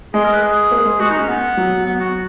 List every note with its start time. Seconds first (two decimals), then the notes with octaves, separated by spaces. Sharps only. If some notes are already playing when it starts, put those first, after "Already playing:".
0.14 G#3 G#4
0.24 A#4
0.33 B4
0.42 G#4
0.71 A#3
0.85 G#3
1.00 G#3 F#4
1.10 D#4
1.19 C#4
1.29 B3
1.57 F#3
1.86 B3
2.00 F#4